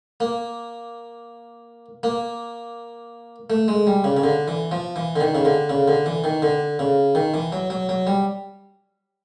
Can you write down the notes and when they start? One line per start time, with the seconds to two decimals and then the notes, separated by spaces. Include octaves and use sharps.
0.20 A#3
2.03 A#3
3.50 A3
3.68 G#3
3.87 G3
4.04 C#3
4.17 C#3
4.23 D3
4.48 E3
4.72 F3
4.96 E3
5.16 D3
5.20 D#3
5.35 C#3
5.45 D3
5.70 C#3
5.88 D3
6.06 E3
6.24 D#3
6.42 D3
6.79 C#3
7.15 D#3
7.34 E3
7.52 F#3
7.70 F#3
7.89 F#3
8.07 G3